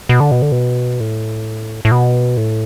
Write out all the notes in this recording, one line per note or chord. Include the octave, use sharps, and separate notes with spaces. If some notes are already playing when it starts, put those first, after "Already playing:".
B2
D3
B2
D3
B2
A2
A2
B2
A2